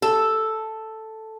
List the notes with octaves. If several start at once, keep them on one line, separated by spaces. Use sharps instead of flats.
A4